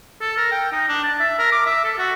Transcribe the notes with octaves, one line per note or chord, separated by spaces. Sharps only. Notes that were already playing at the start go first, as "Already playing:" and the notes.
A4
A#4
G5
D#4
D4
A5
E5
A#4
D6
E5
A4
F#4